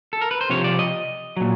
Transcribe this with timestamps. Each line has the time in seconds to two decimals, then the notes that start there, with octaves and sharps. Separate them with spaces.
0.13 A4
0.21 A#4
0.31 B4
0.41 C5
0.50 C3 F3 C#5
0.64 D5
0.79 D#5
1.37 A#2 F#3